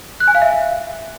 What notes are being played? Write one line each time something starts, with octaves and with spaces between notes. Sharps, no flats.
F#6
G#5
F5
E5